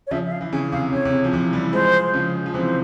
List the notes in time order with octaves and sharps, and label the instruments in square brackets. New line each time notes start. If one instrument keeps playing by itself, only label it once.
[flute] C#5
[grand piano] C#3 F3 [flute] E5
[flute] E5
F5
[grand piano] E3
[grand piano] C#3 [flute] G#5
[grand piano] C3 [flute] F5
[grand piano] C#3 [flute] C#5
[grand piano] C3
C#3
F3
C3 E3
E3 G3
[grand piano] F3 G#3 [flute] C5
[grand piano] C#3 F3
F3
[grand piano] C3 E3 [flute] C5